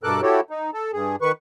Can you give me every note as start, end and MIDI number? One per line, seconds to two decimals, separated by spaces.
0.03 0.21 43
0.03 0.21 47
0.03 0.21 69
0.03 0.21 70
0.03 0.21 86
0.03 0.21 90
0.22 0.40 64
0.22 0.40 66
0.22 0.40 67
0.22 0.40 69
0.22 0.40 73
0.50 0.71 63
0.74 0.91 69
0.93 1.16 43
0.93 1.16 68
1.22 1.32 51
1.22 1.32 71
1.22 1.32 85